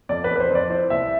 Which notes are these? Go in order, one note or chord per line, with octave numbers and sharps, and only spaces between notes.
F2 D5
B4
F2
B4
C5
F2 D5
E4 C5
C2 E5